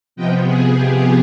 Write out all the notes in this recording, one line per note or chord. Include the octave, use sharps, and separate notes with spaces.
C3 F3 B3 D#5 G5
G#4
G4